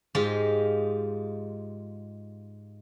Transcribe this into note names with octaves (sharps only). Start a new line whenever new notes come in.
G#2 G#3 F4 G4